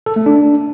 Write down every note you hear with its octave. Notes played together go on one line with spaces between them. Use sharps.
A4
A3
D4